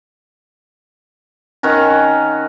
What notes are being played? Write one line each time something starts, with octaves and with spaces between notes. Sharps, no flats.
D#3 C#4 F#5 A#5